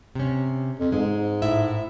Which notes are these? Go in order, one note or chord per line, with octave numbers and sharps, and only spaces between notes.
C3 C#4
F2
G#2 G#3
A2 E4 E5